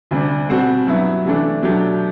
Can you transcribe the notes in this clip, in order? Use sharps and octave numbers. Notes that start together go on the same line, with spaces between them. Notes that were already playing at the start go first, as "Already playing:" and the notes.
D2 C3 G3 D4
B2 G3 C4 F#4
G2 F#3 B3 E4
C3 E3 A3 D4
B2 F#3 A3 D4 G4